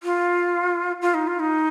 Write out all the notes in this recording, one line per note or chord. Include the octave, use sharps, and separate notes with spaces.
F4
F4
D#4
F4
D#4